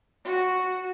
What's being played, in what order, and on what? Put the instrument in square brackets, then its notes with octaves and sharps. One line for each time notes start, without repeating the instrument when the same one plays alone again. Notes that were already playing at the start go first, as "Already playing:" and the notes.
[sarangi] F#4